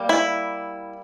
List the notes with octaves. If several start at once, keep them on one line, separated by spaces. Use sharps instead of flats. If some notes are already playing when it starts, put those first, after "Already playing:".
Already playing: G3 A#3
E4